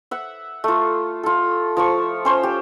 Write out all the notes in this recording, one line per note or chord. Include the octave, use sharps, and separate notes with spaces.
E5 F#5
A3 F4
F4 A4
F3 A5 C#6
C#4 C5 C#5
G4